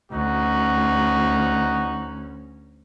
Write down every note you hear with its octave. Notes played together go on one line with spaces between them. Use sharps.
D2 C#4 D#4 F#4